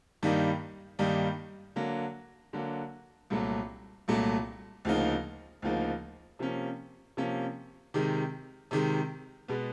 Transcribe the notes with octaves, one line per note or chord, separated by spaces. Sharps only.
G2 D#3 G3 A#3 D#4
G2 D#3 G3 A#3 D#4
D3 F#3 A#3
D3 F#3 A#3
C2 A#2 F#3 A3
C2 A#2 F#3 A3
D2 C#3 F3 A#3 D#4
D2 C#3 F3 A#3 D#4
C3 F3 A#3 C#4
C3 F3 A#3 C#4
C3 D#3 G#3
C3 D#3 G#3
B2 G#3 B3